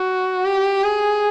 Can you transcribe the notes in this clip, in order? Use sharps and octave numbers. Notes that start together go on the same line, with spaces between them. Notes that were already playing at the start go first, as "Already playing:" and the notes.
Already playing: F#4
G4
G#4